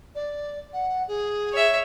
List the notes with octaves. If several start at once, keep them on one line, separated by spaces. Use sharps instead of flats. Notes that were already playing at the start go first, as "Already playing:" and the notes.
D5
F#5
G#4
C#5 E5